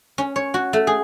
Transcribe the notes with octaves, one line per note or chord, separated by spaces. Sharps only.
C#4
C#5
F#4
A3
G#4